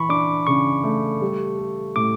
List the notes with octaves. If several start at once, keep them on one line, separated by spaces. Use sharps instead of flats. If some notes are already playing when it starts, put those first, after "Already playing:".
Already playing: E3 B5 C#6
D4 D6
C#3 C#6
A3
G3
A4
A2 D6